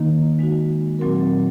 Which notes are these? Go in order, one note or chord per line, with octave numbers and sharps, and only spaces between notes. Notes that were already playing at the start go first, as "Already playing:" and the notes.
Already playing: D#3 A#3 D#4
G#3 D#4 F#4
A#2 F#3 C4 F#4 A#4